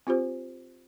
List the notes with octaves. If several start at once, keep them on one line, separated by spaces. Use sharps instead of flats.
C4 F4 G4 C5